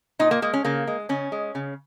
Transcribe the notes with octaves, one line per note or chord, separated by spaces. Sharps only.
A#2 D#4
A#3
G#3 A#3
C#4
C#3 A#3
G#3
C#3 C#4
G#3
C#3